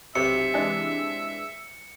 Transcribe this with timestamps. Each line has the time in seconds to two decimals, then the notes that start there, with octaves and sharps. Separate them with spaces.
0.15 B1 C3 E5 C#7
0.54 E3 G#3 D4